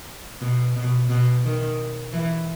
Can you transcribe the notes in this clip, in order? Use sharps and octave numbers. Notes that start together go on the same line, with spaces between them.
B2
B2
B2
D#3
E3